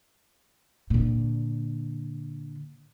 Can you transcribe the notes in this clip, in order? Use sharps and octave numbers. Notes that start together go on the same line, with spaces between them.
A#2 D3